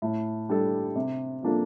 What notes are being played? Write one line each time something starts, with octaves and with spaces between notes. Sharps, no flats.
A2
G3 D4 A4
C3
F3 A#3 D4 A4